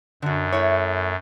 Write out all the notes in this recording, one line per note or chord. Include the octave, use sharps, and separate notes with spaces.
F#2 D3 F#4
A3 E4 C#5